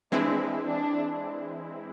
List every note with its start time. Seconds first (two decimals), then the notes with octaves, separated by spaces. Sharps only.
0.12 E3 G#3 C4 D4 E4
0.66 D4